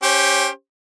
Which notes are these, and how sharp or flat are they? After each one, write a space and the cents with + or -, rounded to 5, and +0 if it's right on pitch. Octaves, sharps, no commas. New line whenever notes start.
C#4 +0 G4 +0 C5 +25